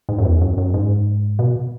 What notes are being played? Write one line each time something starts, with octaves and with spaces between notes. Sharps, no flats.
G#2
F#2
E2
F#2
F#2
G#2
B2